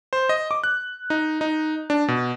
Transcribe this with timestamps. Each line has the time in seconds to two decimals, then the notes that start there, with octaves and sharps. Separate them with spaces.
0.13 C5
0.29 D#5
0.51 D6
0.64 F#6
1.10 D#4
1.41 D#4
1.90 D4
2.08 B2